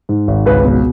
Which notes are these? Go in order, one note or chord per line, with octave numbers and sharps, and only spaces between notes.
G#2
G#1
C#2 B4
B2